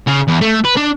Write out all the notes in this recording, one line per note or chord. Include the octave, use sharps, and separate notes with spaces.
C#3
E2
A3
B4
D4